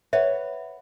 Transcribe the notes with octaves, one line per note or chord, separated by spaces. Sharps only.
B4 C#5 E5 F#5